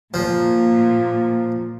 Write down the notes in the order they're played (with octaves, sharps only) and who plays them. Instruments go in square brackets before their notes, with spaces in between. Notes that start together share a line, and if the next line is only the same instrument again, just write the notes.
[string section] A#2 [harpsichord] F3